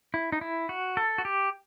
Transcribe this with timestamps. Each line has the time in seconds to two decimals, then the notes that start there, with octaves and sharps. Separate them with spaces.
0.14 E4
0.32 D#4
0.41 E4
0.69 F#4
0.97 A4
1.18 F#4
1.25 G4